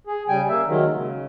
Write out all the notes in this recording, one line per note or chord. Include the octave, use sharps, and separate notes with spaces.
G#4
C#3 G3 G5 G#5
A#3 E5
D#3 F#3 G#3
C#3